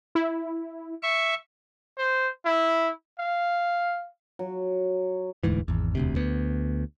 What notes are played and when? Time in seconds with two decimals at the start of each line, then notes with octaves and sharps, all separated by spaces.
0.15 E4
1.03 E5 C#6
1.98 C5
2.45 E4
3.19 F5
4.39 F#3
5.43 E1 D2 G#2 E3
5.68 G#1 E2
5.95 E1 D2 C3
6.16 D2 B3